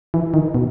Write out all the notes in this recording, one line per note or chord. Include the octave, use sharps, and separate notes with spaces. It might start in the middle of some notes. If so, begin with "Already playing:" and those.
E3
D#3
B2